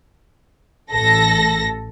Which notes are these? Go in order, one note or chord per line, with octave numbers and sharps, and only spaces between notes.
A1 A4 A#6